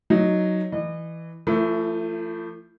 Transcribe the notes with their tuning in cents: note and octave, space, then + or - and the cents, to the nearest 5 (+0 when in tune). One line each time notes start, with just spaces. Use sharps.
F#3 -5 D#4 +0
E3 +0 D#5 -35
F3 -30 A3 +30 E4 +10